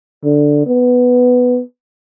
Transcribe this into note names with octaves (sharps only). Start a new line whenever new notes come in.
D3
B3